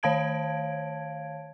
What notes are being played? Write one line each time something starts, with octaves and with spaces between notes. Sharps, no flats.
D#3 C#5 F5 A5 G#6 D7